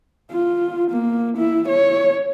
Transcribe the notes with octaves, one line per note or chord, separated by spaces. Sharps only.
F4
A#3
E4
C#5